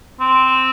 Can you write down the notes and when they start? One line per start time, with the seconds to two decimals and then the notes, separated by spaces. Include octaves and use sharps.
0.20 C4